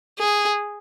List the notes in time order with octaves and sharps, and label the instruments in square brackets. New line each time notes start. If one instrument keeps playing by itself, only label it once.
[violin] G#4